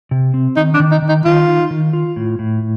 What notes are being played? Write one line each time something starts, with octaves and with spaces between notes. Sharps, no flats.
C3
C4
D#3 D#4
D4
D#3
D#4
D#3
D#4
D#3 F4
D#4
D#3
F4
A2
A2